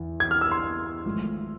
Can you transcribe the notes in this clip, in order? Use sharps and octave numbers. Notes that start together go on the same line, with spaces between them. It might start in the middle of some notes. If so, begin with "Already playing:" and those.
Already playing: E2 E3
G#6
F6
E6
C6
G#1 G#2 F3 A3